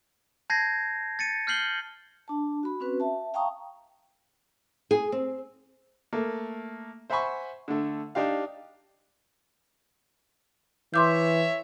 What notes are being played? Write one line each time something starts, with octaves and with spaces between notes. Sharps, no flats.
A5 G6 G#6 A#6 C7
A6 C#7 D#7
F6 G6 C7 F#7 G7
D4 A5
F#4 B5
C4 C#4 F#4 B4
E5 A5
F5 G5 A5 A#5 C#6 D#6
G#4
C4
A3 A#3
C5 E5 F#5 G#5 B5 C#6
D3 A3
D4 D#4 G4 F5
E3 C#5 E5 C6 D6 G6